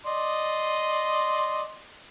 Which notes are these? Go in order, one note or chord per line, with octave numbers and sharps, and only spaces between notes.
D5 D#5 C6